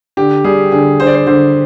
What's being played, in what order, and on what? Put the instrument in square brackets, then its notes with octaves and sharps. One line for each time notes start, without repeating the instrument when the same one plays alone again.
[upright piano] D3 [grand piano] G4
[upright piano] G3 [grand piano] G#4
[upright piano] D3 [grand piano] G#4
[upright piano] D3 [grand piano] C5
[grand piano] D5
C5
[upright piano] D3 [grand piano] C5